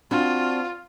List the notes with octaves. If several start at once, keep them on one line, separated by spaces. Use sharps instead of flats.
C4 D4 F4 F#4